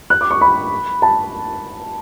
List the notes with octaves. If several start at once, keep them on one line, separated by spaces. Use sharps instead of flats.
F#6
D6
C#6
B5
A5